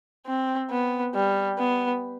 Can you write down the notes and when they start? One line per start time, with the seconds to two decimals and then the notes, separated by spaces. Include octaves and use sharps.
0.26 C4
0.70 B3
1.15 G3
1.58 B3